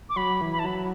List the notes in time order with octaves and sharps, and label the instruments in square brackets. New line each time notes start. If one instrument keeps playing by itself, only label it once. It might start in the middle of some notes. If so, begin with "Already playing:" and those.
[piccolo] D6
[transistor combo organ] F#3 [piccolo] B5
[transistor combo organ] E3
[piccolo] B5
A5
[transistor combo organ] F#3 [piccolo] B5